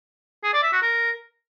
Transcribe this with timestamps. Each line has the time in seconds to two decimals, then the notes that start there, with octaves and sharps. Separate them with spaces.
0.44 G#4
0.53 D5
0.63 E5
0.72 F#4
0.82 A#4